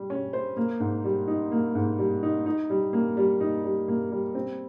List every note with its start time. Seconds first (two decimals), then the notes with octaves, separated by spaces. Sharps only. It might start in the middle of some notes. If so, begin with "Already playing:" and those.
Already playing: G3
0.10 C#4
0.33 C5
0.57 A#3
0.80 G#2
1.04 G3
1.28 D#4
1.51 A#3
1.75 G#2
1.99 G3
2.23 D#4
2.46 D#4
2.70 G3
2.93 A#3
3.17 G3
3.41 D#4
3.64 G3
3.88 A#3
4.11 G3
4.35 C4